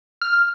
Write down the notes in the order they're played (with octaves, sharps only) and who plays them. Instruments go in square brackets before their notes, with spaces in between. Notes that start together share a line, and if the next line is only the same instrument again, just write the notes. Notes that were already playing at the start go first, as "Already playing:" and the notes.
[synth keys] F6